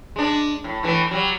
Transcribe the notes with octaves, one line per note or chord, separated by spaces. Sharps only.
G#3 D4
A2
A2 E3 A3
F#3 G3